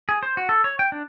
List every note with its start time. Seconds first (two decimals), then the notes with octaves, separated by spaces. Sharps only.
0.09 G#4
0.23 C5
0.37 F#4
0.49 A4
0.64 C#5
0.79 G5
0.92 D4